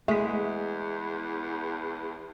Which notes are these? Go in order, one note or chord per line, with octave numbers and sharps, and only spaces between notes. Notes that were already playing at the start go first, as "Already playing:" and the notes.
E2 G#3 A3 B6